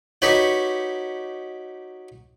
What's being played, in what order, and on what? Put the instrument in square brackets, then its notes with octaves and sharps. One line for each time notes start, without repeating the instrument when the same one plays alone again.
[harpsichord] D#4 F#4 G4 B4 C#5 F#5